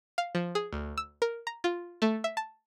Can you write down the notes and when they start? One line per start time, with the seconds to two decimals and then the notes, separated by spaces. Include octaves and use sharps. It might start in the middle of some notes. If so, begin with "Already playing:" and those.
0.18 F5
0.35 F3
0.55 G#4
0.73 D2
0.98 E6
1.22 A#4
1.47 A#5
1.64 F4
2.02 A3
2.24 E5
2.37 A5